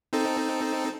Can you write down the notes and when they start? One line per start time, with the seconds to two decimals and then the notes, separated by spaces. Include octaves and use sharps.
0.13 C4 D#4 A4